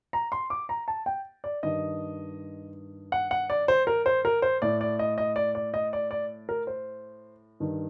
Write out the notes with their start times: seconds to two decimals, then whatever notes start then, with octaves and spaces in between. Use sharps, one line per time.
0.13 A#5
0.32 C6
0.50 D6
0.69 A#5
0.88 A5
1.06 G5
1.44 D5
1.63 G2 D#3 D#5
3.12 F#5
3.31 F#5
3.50 D5
3.68 C5
3.87 A#4
4.06 C5
4.25 A#4
4.42 C5
4.62 A2 D5
4.81 D5
4.99 D#5
5.18 D#5
5.36 D5
5.55 D5
5.74 D#5
5.93 D5
6.11 D5
6.49 A#4
6.67 C5
7.60 G2 D#3